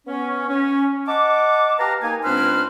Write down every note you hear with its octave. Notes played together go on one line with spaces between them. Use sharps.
B3 C#4
C#4
D#5 F#5 A5 D6
G4 B4 F5 A5 A#5
A#3 D#4 G#5
C#2 C4 D4 B4 C5 F6